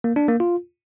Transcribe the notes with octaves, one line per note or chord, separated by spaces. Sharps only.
A#3
D4
A#3
F4